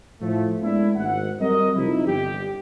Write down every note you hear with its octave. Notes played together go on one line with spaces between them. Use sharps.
A2 F3 A3
G#3 A3 B3 C#4 D4 E4
G#1 F#5
F#3 G3 C4 F#4 A#4 D#5
F2 C3 D#4 E4
G1 G4